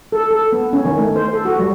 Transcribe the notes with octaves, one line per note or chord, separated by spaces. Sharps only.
A4
A4
B3
C#4
D#3
A3
C5
A4
F#4
G3